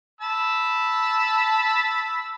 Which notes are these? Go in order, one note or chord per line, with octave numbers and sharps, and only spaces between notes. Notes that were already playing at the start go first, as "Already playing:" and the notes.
A5 B5 E6